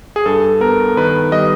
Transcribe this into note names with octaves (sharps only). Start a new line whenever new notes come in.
G#4
G2 A4
B3 A#4
D#3 B4
G3 D#5